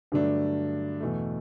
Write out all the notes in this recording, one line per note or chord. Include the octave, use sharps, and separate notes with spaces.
G2 D3 F#3 A3 D4
E2 B2 A3